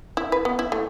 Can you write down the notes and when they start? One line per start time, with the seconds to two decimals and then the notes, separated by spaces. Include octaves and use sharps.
0.17 E4
0.32 B4
0.45 B3
0.59 E4
0.72 A3